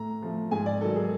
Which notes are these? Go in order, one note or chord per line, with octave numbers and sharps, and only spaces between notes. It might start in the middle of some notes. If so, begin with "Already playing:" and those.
Already playing: A2 A#5
F3 A3
G#2 G#5
D5
D#3 F#3 A4
G#4